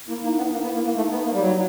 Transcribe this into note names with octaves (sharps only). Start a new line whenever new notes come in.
A#3 E4
A#3 D#4
B3 D4
D#4
A#3 E4
B3
A#3
A#3
A3 D#4
B3
A#3
G3
F#3